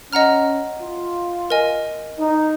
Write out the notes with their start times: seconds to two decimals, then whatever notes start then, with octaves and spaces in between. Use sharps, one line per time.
0.12 C#4 D#5 F#5 A#5 F6
0.81 F4
1.50 A#4 D#5 G#5
2.19 D#4